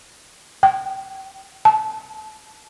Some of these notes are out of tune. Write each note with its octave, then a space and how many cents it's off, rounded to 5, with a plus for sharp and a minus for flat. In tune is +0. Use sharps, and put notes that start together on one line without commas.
G5 -25
A5 -20